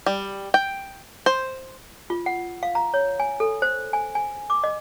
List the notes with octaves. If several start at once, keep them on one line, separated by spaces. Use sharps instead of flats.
G3
G5
C5
F4
F#5
F5
A#5
C#5
G#5
A4
C5
G#5
G#5
D6
D#5